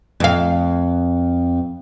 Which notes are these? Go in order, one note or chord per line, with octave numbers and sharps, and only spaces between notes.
F2 F5